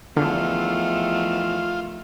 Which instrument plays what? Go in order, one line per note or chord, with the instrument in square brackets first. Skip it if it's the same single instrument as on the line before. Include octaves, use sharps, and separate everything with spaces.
[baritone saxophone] E2 [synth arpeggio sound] D3 [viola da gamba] D#3 F3 A3 [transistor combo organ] F4